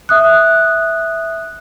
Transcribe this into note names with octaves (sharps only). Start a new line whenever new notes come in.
E5 D#6 F#6